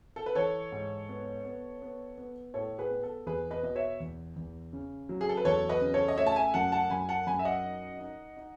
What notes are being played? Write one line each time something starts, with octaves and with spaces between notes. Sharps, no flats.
A4
B4
E3 A4 C#5
G#2
B3
B3
B3
B3
A2 A4 C#5
G#4 B4
B3
A4
E2 G#4 B4
B4 D#5
B2 D#5
C#5 E5
E2
E2
C#3
F#3
G#4
A4
B4
E2 A4 C#5
B4 D#5
C#3
A4 C#5
D#5
A3 C#5 E5
A5
E5 G#5
F#2 F#5 A5
F#5 A5
F#2 G#5 B5
F#5 A5
F#2 G#5 B5
E5
D#5 F#5
D#4
D#4
D#4